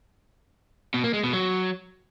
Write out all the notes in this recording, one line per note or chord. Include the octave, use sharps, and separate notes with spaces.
B2
A#3
G#3
B2
F#3